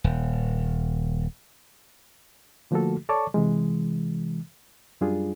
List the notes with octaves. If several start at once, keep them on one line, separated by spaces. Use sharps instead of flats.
D#1
D3 F3 A3 A#3 F#4 A4
A4 C#5 D5 A5 C#6 D6
C3 E3 G#3
F#2 G3 D4 F4 G#4